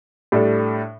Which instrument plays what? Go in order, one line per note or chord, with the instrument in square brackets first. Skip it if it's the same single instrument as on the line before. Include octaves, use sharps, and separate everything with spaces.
[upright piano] A2 G3 D4 A4